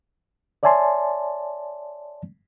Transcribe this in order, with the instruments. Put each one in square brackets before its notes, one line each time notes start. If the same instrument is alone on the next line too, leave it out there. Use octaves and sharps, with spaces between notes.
[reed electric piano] C#5 D5 E5 G#5 A5 C6